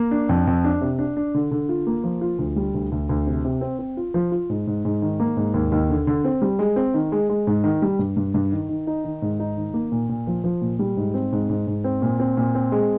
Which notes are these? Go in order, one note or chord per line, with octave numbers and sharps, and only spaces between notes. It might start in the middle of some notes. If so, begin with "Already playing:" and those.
Already playing: A#3
D4
F2
F2
D4
C3
D4
D4
D3
D3
F4
A#3
F3
F4
D2
G3
D2
D2
D2
C3
C3
C4
C4
F4
F3
F4
G#2
G#2
G#2
D#3
A#3
G#2
D#2
D#2
D3
D3
C4
G3
G#3
C4
D#3
G#3
G#3
G#2
D#3
G3
G2
G2
G2
D#3
D#3
D#4
D#3
G#2
D#4
D#3
A#3
A#2
A#2
F3
F3
A#2
G3
G#2
C4
G#2
G#2
G#2
C4
A#2
C4
A#2
C4
G#3